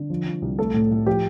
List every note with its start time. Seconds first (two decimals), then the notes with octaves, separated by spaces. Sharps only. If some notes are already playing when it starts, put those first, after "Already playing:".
Already playing: D3
0.10 F3
0.26 F3
0.42 C2
0.58 A3 A4
0.74 A2
0.91 A2
1.06 F3 G4